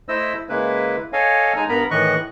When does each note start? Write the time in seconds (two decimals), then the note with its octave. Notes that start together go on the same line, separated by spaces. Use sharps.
0.09 A3 E4 C5 D#5 E6
0.49 C#3 G#3 A#3 E4 B4
1.13 A4 C#5 D#5 F5 G#5
1.56 G#3 D#4 G#5 A#5
1.69 G2 B3 A#4 A#5 B5
1.91 A2 D#3 E3 D#5 C#6 F#6